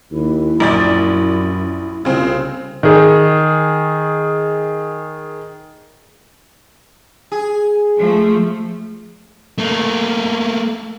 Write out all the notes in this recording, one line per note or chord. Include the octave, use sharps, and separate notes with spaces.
D#2 E4
A#1 F#2 D5 A6
C2 C#3 C4 F4
D#3 G#4
G#4
F3 A3
A3 A#3